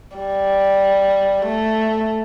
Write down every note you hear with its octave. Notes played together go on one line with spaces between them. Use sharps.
G3
A3